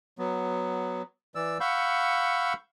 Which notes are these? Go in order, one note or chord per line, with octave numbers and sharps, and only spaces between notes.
F#3 B3
E3 D5 E6
F5 F#5 B5 C#6 E6 G6